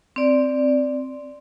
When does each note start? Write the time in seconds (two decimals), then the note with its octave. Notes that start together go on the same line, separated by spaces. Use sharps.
0.16 C4 D5